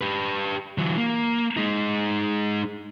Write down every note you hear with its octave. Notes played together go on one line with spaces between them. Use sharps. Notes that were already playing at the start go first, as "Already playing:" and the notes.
G4 B4
E3 F#3
A#3
G#3 D#4